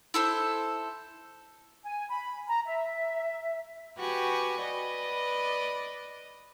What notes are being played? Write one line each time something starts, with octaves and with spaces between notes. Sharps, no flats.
E4 A4 C5
G#5
B5
A#5
E5
F#4 G4 B4 G#5 C#6
B4 D5 D#5